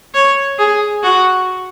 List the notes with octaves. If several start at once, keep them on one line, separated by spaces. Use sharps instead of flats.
C#5
G#4
F#4